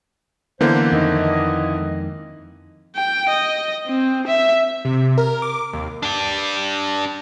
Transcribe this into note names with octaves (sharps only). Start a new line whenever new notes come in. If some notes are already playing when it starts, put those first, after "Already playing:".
D3 E3 A#3 B3 C5
F2 D#3 D#5
G#3
G5
D#5
C4
E5
C3
A#4
D6
D#2
D4 G4